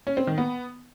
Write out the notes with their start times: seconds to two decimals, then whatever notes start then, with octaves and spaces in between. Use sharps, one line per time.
0.07 C#4
0.17 C4
0.27 D#3
0.38 B3